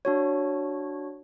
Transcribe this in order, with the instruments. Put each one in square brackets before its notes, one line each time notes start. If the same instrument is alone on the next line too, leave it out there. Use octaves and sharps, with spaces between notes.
[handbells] D4 F#4 C#5